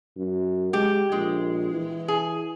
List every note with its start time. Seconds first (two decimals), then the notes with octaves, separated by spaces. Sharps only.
0.17 F#2
0.73 G#3 G4
1.12 A#1 G#3
1.71 E3
2.08 G#4